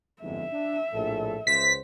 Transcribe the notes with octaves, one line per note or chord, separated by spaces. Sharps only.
G1 F2 G#2 E5
D4
A#1 A2 A4
C#2 C5 B6